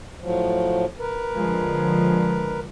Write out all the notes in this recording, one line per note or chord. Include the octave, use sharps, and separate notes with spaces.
A2 F3 F#3
A#4 B4
D3 F3 G#3